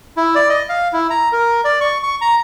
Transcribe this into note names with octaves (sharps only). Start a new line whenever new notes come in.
E4
D5
D#5
F5
E4
A#5
A#4
D5
C#6
C#6
A#5